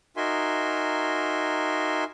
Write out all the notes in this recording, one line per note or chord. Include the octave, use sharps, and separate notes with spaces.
D#4 F#4 A#4 E5 G#5 C6